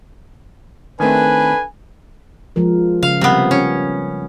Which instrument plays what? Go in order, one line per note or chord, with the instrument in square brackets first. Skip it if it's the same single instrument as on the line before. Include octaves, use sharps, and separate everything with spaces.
[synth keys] D#3 A3 C4 [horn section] D4 A4 B4 [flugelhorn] G#5
[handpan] F3 G#3 A#4
[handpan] C#3 [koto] F5
[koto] C3 B3 [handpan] G3 A#4
[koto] C#4